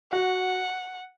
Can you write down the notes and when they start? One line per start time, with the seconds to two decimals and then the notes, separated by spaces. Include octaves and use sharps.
0.12 F#4 F#5